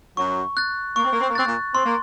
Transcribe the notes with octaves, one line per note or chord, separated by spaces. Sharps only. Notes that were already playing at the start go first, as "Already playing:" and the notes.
F#2 F#3 C#6
F#6 A6
A#3 C#6
C4
A#3
C4
A#3
C4 F#6 A6
A#2 A#3
C4 C6
A#3